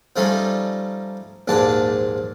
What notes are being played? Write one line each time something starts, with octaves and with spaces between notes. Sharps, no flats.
F3 G3 A3 C#4 D#4
A#1 D#2 G#2 G4 A5